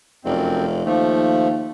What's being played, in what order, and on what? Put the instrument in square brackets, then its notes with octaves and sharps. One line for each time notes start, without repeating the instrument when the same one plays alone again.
[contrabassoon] F1 [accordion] F#2 C4
[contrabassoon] D#2 [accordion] F3 A3